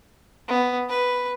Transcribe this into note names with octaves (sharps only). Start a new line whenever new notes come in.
B3
B4